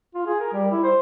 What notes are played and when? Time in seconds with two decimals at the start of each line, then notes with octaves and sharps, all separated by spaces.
0.15 F4
0.26 G#4
0.40 A#4
0.53 G3
0.71 E4
0.84 C5